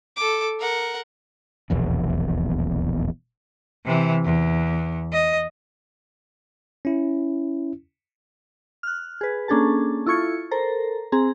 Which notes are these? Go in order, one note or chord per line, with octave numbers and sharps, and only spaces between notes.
A4 D6
A#4 F#5
D#1 A#1 E2 B2
C3 E3
E2
D#5
C#4 E4
F6 F#6
G#4 B4
A#3 C#4 D4 G#4 A4 A5
E4 F4 A4 C#6 G#6 C#7
A4 A#4 C5 A#5
C4 G#4 A#5